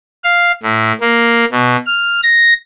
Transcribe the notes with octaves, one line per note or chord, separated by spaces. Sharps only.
F5
A2
A#3
B2
F6
A#6